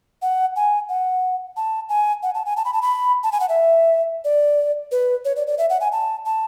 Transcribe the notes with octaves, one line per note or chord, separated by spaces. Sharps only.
F#5
G#5
F#5
A5
G#5
F#5
A5
G#5
A5
B5
A5
B5
A5
G#5
F#5
E5
D5
B4
C#5
D5
D5
E5
F#5
G#5
A5
A5